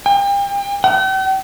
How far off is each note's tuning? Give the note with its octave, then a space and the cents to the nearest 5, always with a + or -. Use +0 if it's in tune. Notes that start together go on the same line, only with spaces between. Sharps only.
G5 +35
G5 -45